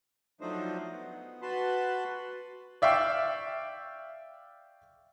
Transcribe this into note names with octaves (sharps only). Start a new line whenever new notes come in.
F3 F#3 A3 D4 D#4 C5
B3
F#4 B4 A5 B5 C6
D5 E5 F5 G5 C#6 E6